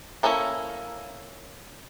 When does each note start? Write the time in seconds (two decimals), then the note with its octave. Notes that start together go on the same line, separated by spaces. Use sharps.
0.23 A#3 C#4 E4 A4 A#4